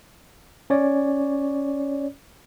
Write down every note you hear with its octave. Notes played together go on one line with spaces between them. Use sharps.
C#4 C#5 D5